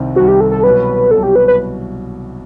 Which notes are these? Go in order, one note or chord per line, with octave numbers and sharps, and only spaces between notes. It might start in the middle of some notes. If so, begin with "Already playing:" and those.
Already playing: C2 C3 D#3 G3 C4
C2 C3 D#3 G3 C4 F#4
G4
A4
A4
C2 B2 F#3 B4
C2 B2 F#3 A4
G4
B4
B4